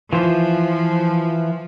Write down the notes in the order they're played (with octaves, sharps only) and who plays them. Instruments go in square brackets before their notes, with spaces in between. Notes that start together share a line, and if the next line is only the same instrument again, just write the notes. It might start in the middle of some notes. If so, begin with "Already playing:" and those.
[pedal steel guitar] E3 F4 C5 [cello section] F3